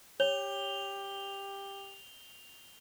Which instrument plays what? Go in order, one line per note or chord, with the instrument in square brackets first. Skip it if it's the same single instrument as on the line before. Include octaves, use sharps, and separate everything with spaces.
[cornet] G4 [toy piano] C#5 [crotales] F7 G7